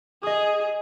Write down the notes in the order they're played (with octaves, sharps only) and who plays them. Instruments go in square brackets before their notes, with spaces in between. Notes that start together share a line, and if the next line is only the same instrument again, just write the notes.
[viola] G#4 [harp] D#5 D#6